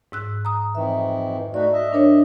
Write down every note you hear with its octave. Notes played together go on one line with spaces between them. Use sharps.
G#2 E6 F#6
A#5 D#6
F2 D#3 E3 E5
A3 D#4 F#4 D5
D#5 E5
D4 A#4 C#5